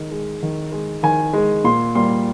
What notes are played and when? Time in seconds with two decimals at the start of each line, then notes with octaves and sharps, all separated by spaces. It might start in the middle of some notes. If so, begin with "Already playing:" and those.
Already playing: D#3 G#3
0.11 G#3
0.43 D#3
0.72 G#3
1.03 D#3 G#5
1.33 G#3
1.64 A#2 C6
1.95 G3 A#3 C6